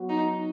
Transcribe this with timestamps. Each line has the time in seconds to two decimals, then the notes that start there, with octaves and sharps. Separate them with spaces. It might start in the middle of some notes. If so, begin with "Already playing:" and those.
Already playing: F#3 B3 F#4
0.09 D#4